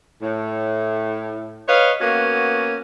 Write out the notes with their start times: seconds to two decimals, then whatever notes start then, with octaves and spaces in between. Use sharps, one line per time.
0.22 A2
1.68 B4 C#5 D#5 F5
2.01 A#3 B3 C#4 F#4